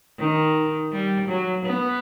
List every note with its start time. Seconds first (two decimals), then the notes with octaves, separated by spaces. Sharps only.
0.18 D#3
0.92 G3
1.28 F#3
1.65 B3